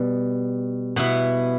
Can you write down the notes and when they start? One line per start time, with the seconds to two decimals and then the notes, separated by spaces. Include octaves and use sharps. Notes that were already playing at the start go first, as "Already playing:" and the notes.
Already playing: B2 G3
0.96 B2 B3 E4